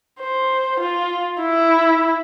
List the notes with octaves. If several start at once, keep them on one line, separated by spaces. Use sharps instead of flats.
C5
F4
E4